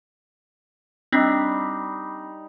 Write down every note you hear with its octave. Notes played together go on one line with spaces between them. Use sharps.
G3 C4 D4 D#4 B6